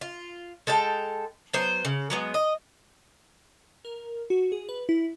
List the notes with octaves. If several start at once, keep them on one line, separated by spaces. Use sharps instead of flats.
F4
G#3 A4 F5 G5
F#3 B3 C5
C#3
F#3 G#3 B3
D#5
A#4
F#4
G#4
B4
E4